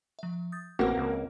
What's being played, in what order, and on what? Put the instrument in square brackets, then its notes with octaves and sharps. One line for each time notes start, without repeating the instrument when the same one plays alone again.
[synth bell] F3 E5
D#6 G6 A6
[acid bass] A1 [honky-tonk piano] A#3 F#4 [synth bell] C4 B4 C5
[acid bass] C#2